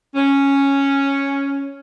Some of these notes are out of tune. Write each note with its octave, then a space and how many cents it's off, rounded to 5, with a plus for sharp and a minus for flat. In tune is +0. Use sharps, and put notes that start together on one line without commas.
C#4 +0